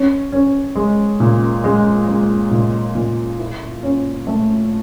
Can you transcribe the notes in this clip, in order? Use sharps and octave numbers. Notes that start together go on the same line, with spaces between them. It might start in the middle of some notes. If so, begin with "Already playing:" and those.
Already playing: C#4
C#4
G#3
A#2
G#3
G#3
A#2
A#2
E4
C#4
A3